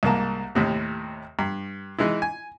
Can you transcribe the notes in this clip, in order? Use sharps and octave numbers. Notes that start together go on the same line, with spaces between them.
C2 G#2 A#3 A5
D#2 A2 C3
G2
E3 G#3 D#4 E4
G#5